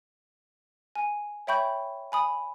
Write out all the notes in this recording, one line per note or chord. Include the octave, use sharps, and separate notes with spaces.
G#5
C#5 E5 G5 B5 C#6 G6
G#5 B5 D#6